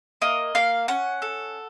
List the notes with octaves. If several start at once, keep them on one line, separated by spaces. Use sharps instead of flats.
A#3 D#5
A#3 F5
C#4 F#5
A4